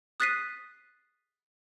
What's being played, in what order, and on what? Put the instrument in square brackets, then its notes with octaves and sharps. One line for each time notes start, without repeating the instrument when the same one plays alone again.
[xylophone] D#6 F#6 A6 B6 C7 D#7